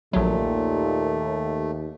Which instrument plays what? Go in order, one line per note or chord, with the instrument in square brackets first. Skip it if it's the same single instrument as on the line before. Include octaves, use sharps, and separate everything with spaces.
[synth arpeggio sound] A#1 F#3 [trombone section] D#2 [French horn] A#2 [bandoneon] A3